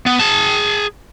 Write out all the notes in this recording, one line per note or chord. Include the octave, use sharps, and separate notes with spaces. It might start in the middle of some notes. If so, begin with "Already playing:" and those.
B3
G#4 A5